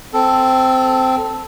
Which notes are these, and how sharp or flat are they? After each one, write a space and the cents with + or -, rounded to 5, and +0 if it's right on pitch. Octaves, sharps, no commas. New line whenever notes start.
C4 -10 A4 +0